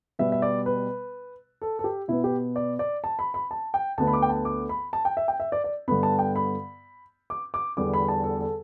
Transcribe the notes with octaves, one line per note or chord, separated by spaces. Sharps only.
B2 G3 B3 E5
E5
D5
B4
A4
A4
G4
B2 B3 E4
G4
D5
D5
A5
B5
B5
A5
G5
D2 D3 B3 A5
B5
D6
G5
A5
D6
B5
A5
G5
E5
G5
E5
D5
D5
G2 D3 B3 B5
A5
G5
B5
D6
D6
E2 D3 G3 B3 D6
B5
A5
A4
A4